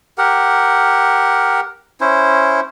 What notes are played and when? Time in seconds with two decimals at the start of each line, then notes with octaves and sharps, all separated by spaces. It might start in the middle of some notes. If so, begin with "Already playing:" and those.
0.18 G4 A#4 F#5
2.01 C#4 E4 C5